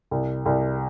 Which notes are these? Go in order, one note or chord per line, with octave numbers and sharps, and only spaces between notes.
C2
C2